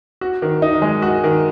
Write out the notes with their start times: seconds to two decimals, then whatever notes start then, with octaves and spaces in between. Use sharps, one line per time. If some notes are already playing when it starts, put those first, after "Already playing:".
0.21 F#4
0.42 D#3
0.62 D#4
0.82 G#3
1.02 F#4
1.24 D#3